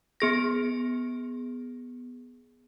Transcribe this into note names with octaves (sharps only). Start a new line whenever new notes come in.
B3 G#4 A#6